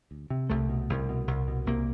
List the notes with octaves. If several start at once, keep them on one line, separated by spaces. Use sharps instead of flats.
D2
C3
C2 A3
B2
C2
B2
C2
B2
C2 A#3